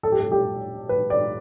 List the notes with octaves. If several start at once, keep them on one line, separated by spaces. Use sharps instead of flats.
A4
G4
A4
G4
B4
D5